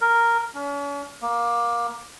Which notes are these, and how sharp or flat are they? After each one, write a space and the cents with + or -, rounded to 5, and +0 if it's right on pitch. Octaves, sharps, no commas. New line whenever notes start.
A#4 -5
C#4 +40
A#3 +20